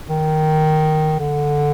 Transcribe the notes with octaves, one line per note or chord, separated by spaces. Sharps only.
D#3
D3